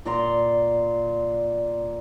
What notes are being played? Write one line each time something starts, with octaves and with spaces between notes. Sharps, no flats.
A#2 D5 A#5 C6